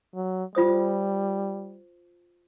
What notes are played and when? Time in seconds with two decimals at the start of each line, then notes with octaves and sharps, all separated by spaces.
0.14 F#3
0.55 G3 F4 C5 D#6